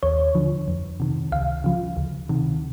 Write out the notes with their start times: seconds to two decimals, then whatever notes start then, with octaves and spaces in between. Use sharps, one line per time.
0.03 D#2 C#5
0.35 D3 F3
0.68 F2
1.00 C3 D#3
1.32 C#2 F5
1.64 C#3 F3
1.97 D2
2.29 C3 D#3